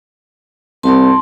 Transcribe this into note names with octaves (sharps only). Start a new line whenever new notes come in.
C2 A5 C6